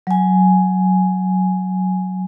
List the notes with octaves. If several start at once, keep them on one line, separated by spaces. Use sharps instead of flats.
F#3 G#5